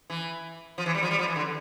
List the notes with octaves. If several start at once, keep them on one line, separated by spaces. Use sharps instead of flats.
E3
F3
E3
G3
F3
G3
F3
E3
D3